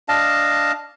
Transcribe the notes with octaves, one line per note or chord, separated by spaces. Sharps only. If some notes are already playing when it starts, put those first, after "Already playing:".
D4 D#5 F5 A5